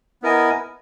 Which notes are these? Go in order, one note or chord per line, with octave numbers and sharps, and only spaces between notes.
B3 E4 A#4 D#5 G#5